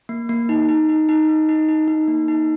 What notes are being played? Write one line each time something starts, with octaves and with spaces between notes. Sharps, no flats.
A#3
A#3
D#4
D#4
D#4
D#4
D#4
D#4
D#4
D#4
A#3
D#4